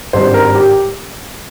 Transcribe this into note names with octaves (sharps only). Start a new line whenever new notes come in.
G#1 G2 G3 C4 C5
A#4
G4